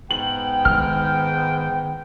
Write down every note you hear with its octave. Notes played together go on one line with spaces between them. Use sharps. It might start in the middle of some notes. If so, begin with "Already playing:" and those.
G#2 B3 G5 F#7
D#3 G#3 F6